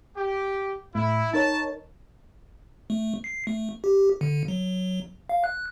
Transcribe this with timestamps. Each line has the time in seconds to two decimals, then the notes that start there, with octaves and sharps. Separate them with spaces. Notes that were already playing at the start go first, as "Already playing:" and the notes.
0.17 G4
0.95 A2 E4
1.34 D#4 A#4 C#5 A5
2.90 A3
3.24 C7
3.47 A3
3.84 G4
4.21 D3
4.48 F#3
5.29 F5
5.44 F#6